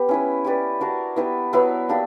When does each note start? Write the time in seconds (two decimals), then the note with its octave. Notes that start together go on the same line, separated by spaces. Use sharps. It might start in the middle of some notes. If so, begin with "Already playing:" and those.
Already playing: B3 G4
0.09 C#4 E4 B4
0.44 E4 G4 B4 D5
0.81 D4 F#4 A#4
1.16 B3 E4 G4 B4
1.53 F#3 B3 E4 B4
1.89 A#3 D4 G4